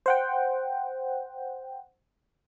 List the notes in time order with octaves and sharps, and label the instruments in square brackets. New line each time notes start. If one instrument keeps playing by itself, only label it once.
[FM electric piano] C5 F#5 G5